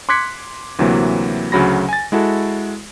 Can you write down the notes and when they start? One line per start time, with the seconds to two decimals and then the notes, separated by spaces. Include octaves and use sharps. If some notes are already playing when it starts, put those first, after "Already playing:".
0.09 C6 D6 F#6 G#6 B6 C#7
0.79 D2 C3 E3 F#3 A#3
1.52 D2 C#3 F#3 B5 A#6
1.89 G#5 A6
2.12 G#3 E4 F#4 A4